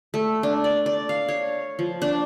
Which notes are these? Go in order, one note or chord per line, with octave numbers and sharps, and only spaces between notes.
A3
D4
D5
D5
F5
C#5
F3
D4